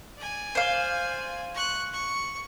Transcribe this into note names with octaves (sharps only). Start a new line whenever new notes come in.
D5 G#5
C5 F5
C#6 F#6
C#6